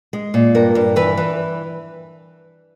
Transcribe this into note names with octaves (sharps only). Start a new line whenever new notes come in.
G#3
A#2
G2 A#4
G2
E3 B4
E3